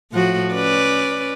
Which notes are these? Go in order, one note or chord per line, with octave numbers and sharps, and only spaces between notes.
A2 F3 F#4
C#4 B4 D5